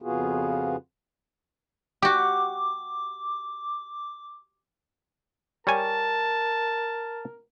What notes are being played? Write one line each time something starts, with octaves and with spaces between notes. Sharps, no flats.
F2 C#3 B3 F4 F#4 G#4
F#4 G4 D6
G3 A#4 C#5 G#5 A5